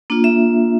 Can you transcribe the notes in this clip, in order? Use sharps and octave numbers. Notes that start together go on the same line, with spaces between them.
A#3 D4 F4
E5